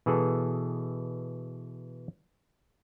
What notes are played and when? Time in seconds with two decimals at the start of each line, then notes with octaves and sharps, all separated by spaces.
0.06 B2 E3 G#4 A4